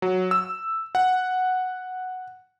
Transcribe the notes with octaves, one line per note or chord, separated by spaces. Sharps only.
F#3
E6
F#5